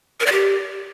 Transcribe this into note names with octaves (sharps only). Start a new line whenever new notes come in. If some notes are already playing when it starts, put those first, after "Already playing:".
A#4
D5
G4